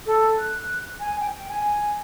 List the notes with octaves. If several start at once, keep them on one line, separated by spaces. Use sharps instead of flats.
A4
F#6
G#5
G5
G#5